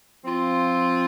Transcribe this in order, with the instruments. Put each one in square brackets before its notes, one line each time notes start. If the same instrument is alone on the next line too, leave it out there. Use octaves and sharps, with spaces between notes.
[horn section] F3 C4 F4